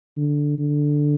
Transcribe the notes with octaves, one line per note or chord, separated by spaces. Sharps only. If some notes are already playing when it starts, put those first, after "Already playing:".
D3
D3